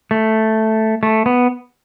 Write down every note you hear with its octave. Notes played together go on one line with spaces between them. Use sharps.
A3
A3
B3